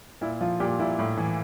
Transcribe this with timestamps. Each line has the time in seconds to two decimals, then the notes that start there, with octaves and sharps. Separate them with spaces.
0.21 A#2 E4
0.41 F3 F4
0.60 A#2 G4
0.79 A#2 E4
0.99 A2
1.17 E3